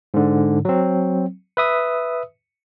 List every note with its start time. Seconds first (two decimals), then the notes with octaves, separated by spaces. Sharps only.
0.14 G#2 D3
0.65 F#3 C4
1.57 B4 E5 D#6